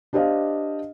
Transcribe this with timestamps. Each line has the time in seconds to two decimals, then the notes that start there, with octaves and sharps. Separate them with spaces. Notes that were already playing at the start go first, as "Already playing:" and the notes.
0.13 D4 G4 C5 D#5 F5